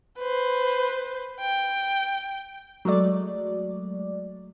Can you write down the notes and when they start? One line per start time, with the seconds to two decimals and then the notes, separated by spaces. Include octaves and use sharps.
0.19 B4 C5
1.41 G5
2.85 F#3 G#3 A3 D5